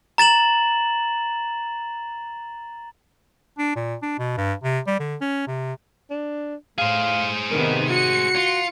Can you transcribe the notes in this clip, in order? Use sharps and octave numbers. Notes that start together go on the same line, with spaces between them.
A#5 A6 E7 F#7
D4
A#2
D4
B2
G2
C3
G3
D3
C#4
C3
D4
A2 G#4 C5 F5
C3 D#3 B3 A#4
F#4 C#7
F4